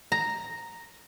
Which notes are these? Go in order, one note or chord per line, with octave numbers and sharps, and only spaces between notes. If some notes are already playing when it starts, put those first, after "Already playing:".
A#5